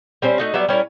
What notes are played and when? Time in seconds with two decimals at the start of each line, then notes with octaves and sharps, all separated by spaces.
0.22 G3 C4 C#4 C5
0.38 A3 D#4 F#4
0.54 F#3 G3 B3 E5
0.68 G3 C#4 E4 A#4